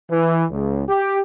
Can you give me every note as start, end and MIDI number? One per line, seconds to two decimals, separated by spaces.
0.10 0.44 52
0.51 0.84 37
0.89 1.19 67